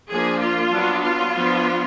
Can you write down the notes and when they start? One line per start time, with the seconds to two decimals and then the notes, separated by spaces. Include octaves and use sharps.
0.10 F3 A#3 D4 G#4
0.41 F4
0.72 F#3 B3 D4
1.03 F4
1.34 F3 B3 D4